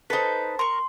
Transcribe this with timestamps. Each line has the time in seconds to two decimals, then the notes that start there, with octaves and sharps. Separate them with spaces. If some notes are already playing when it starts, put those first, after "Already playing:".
0.10 D#4 A4 B4 C5
0.59 A#4 C6 C#6